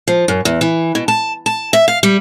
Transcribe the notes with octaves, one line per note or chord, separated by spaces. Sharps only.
F3
F#2
E2
E3
B2
A5
A5
E5
F5
G3